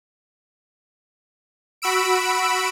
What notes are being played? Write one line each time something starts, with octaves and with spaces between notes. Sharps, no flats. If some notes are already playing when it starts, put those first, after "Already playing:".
F#4 B5 E6 D7